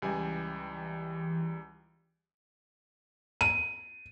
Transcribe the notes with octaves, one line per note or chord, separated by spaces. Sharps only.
C#2 E3 G3 G#5
D#7